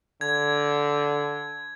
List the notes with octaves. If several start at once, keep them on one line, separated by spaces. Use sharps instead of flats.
D3 G#6